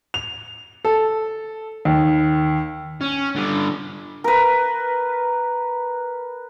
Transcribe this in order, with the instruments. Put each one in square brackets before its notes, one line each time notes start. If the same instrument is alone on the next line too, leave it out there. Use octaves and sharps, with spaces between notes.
[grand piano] F7
A4
D#2
[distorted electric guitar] C#4
D3 G3
[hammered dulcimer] A#4 B4